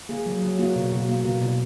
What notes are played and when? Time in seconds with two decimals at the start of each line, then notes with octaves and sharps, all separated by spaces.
0.09 A#3 G#4
0.26 F#3
0.42 F#3
0.59 A#3 F#4
0.76 B2
0.92 B2
1.09 A#3
1.25 B2
1.42 B2